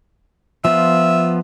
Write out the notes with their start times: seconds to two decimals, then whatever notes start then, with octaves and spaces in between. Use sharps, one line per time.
0.65 F3 B3 F4 E5